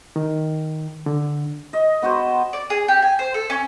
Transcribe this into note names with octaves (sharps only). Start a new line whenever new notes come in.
D#3
D3
D#5
B3 F#4 B4 C5
D5
G#4
G4
G#5
C5
A4
C#4